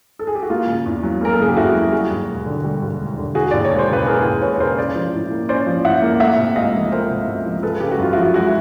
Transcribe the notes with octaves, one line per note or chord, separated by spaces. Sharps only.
A4
G#4
G4
F#4
A#3 F4
C#3
E2
F#3
A#3 A#4
A4
C#3 G#4
G4
E2 E4 F#4
F#3
G3 F#4 G#4
D#2
E1
D3
G3
D#2
E1
D3
E3 F#4 G#4
D#2 D5
C#5
E1
C5
C#3 B4
E3 G#4 A#4
D#2
E1 B4 C#5
C#5
C#3 A#4 C5
C#4 C5 D5
F3
A2
A#3
C#4 C5 D5
F3
A2 E5 F#5
A#3
A3 E5 F#5
C3
C#2 D#5 F5
F3
A3 A#4 C5
C3
C#2
F3
G#3 A4 B4
C#3 G4
F#4
F#2 F4
F3 E4 F#4
G#3 E4 F#4